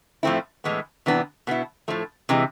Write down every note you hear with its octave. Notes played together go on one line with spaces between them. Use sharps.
A2 F3 A3 C4 E4
A2 E3 G#3 B3
C3 E3 B3 D4
B2 B3 E4
A2 F3 A3
C3 E3 G#3